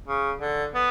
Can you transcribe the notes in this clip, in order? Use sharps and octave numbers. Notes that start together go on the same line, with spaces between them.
C#3
D3
B3